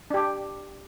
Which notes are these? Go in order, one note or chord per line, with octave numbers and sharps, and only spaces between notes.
D4 G4